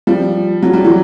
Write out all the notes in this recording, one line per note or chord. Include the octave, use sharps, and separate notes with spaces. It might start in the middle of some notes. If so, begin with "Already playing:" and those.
F3 G3
F#3
G3
E3 F#3